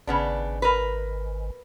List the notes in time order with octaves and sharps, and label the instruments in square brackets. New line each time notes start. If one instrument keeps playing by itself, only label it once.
[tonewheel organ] G#1 [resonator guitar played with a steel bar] C#3 B3 D4
[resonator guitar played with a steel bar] A#4 B4